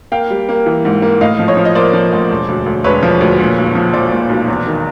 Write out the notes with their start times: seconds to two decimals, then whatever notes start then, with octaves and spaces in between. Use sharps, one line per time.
0.12 A#3 F5 G5
0.30 G3
0.49 A#3
0.66 E3
0.85 G#2
1.02 A#3
1.21 A2 D#5 F5
1.39 F3
1.48 C#5 D#5
1.57 F3
1.65 D#5
1.75 A#3 C5 D5
1.93 F3
2.12 A1
2.30 E1
2.48 D2
2.66 D2
2.84 E1 B4 C#5
3.03 F3
3.21 D2
3.39 A#2
3.58 B1
3.75 F3
3.93 F3 C5 D5
4.12 A#2
4.29 B1
4.48 E2
4.67 D#3